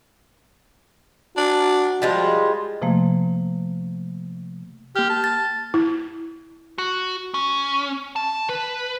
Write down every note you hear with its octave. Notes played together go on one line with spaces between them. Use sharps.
D4 F#4
F3 G3 G#3 F4
C3 F3 A3 A#3
A#3 G4 F6
A5
A6
E4
F#4
C#4
A5
B4